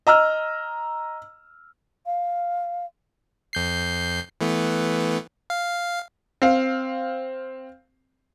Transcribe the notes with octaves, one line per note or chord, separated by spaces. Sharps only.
D#5 A#5 E6 F6
F5
F2 G6 C7
E3 A3 B3
F5
C4 F5